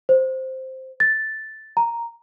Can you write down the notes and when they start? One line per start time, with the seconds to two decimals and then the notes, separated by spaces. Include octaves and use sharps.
0.09 C5
1.00 A6
1.77 A#5